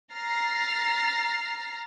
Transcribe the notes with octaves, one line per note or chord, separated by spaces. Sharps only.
A#5 F6 A6 C7